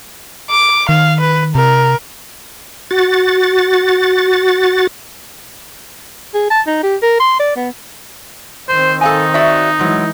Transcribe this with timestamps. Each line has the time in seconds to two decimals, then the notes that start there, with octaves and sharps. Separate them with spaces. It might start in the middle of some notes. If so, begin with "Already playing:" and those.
0.51 D6
0.89 D#3 F5
1.20 B4
1.55 C3 A#4
2.91 F#4 A6
6.34 G#4
6.50 A5
6.67 D#4
6.83 G4
7.02 A#4
7.20 C6
7.40 D5
7.56 B3
8.69 D#3 C4 C5
9.01 D#4 A4 F5 G#5
9.34 F#4 D5 E5
9.79 G#2 E3 F#3 G#3